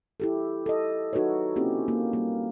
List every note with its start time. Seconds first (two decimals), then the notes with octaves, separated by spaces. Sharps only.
0.20 E4 G4 A4
0.66 A4 D#5
1.13 D#4 F#4 A4 B4 C#5
1.56 A#3 C4 C#4 E4 G4
1.88 A#3
2.13 G3 A#3